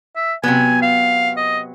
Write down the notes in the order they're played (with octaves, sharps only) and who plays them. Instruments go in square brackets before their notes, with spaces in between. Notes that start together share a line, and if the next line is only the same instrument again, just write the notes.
[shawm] E5
[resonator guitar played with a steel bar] C3 F#3 B3 [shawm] G#5
[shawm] F5
D#5